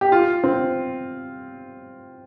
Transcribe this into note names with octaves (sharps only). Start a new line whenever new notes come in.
G4
F4
C4